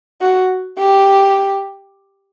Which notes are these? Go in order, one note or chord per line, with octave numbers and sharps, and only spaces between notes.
F#4
G4